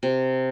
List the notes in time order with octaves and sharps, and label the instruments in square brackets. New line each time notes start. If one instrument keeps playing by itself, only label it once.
[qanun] C3